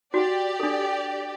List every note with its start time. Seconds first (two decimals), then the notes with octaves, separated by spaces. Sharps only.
0.14 F#4 G4 D5 F#5
0.60 D4 A4